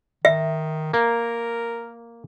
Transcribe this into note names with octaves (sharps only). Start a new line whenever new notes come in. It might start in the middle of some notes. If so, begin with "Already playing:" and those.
D#3 E5
A#3 A#4